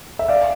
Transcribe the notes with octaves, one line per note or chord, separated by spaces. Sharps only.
E5
D5 F5